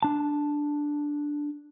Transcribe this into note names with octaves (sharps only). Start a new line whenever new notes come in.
D4 A5